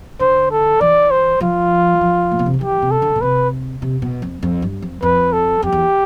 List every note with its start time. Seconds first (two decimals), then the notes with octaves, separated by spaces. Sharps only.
0.20 D3 C5
0.51 A4
0.81 E3 D5
1.11 C5
1.41 F3 F4
2.01 F3
2.32 A2
2.39 B2
2.46 C3
2.54 D3
2.61 E3 G4
2.82 C3
2.91 A4
3.02 D3
3.16 B2
3.21 C3 B4
3.82 C3
4.02 B2
4.22 F2
4.43 F2
4.62 G2
4.83 F2
5.02 F2 B4
5.33 A4
5.62 F2 G4
5.72 E2